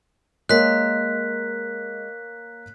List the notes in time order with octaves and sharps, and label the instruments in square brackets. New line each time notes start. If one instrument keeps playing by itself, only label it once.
[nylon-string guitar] G#3 [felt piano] A#3 A#4 C#5 [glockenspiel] F#6 B6